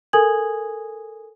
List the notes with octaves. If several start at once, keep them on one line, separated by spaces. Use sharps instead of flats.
A4 A#4 G#5 D#6 G#6 F#7